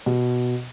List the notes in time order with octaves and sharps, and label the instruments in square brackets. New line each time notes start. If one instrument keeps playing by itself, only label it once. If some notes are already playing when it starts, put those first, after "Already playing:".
[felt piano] B2